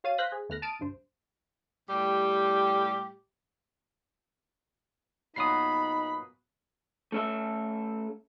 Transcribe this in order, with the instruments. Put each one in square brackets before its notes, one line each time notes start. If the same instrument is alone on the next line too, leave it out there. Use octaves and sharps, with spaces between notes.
[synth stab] F#4 C#5 F5 A6 D#7
C5 F5 C6 F#6 A#6 B6
G#4
D#2 A3 B3 F6 F#6 A#6
A5 D#6 F6 A6 D7 D#7
G1 C2 G2 C5
[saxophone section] A2 G3 G4
[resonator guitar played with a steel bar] A#2 F#3 B3 [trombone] D#4 [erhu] B5 [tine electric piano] D#6 C7
[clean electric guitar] A3 C#4 A4 E5